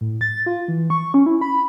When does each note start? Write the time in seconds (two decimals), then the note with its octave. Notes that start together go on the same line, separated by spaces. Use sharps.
0.01 A2
0.21 A6
0.46 F4
0.68 E3
0.90 C#6
1.14 C#4
1.26 E4
1.41 B5